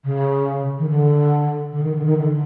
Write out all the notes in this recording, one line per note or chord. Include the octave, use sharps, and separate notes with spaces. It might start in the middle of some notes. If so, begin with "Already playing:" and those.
C#3
D#3
D3
D3
D#3
D3
D#3
D3